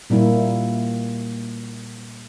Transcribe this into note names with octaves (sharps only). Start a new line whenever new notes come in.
A#2 G3 A#3 E4